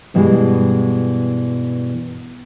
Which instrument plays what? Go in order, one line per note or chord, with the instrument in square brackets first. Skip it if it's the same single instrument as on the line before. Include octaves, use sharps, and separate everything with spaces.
[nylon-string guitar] G2 B2 E3 G3 G#3